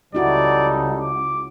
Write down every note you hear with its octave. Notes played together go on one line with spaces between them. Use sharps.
C#2 G3 D#4 E4 F#4 A4 D5
D6